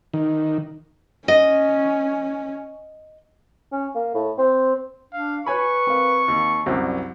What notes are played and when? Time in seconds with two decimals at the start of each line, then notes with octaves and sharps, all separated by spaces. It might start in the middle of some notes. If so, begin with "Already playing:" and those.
0.14 D#3
1.28 C#4 D#5
3.72 C#4
3.95 A#3
4.14 A2
4.38 C4
5.13 D4 F5
5.46 B4 C#5 G#5 B5 C#6
5.87 C4 A#4 F5
6.28 D#2 D#3
6.66 C2 F#2 F#3 G3 C4